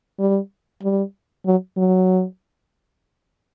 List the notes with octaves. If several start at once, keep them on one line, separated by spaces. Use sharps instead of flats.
G3
G3
F#3
F#3